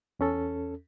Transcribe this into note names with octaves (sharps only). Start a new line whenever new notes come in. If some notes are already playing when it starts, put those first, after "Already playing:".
E2 C#4 A4